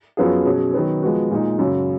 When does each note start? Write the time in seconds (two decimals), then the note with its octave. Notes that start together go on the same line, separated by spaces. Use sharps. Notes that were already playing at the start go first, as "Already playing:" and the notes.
0.17 F#2 F3 B3 F4 G#4
0.45 B2 F#3 C#4 G#4
0.74 D#3 F#3 B3
1.03 F3 G#3 B3 F#4
1.31 A#2 G#3 D#4
1.59 F#2 C#3 F#3